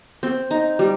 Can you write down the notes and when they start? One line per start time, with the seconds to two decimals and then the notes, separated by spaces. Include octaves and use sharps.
0.23 C4
0.51 D#4
0.79 G3